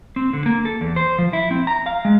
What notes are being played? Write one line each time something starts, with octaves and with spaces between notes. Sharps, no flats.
C4
D3
A#3
A4
E2
C5
F3
E4
C4
A#5
F5
G#3